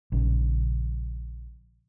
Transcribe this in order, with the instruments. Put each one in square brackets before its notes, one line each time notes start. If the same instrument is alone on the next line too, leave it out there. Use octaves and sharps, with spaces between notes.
[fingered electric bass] A#1 C#3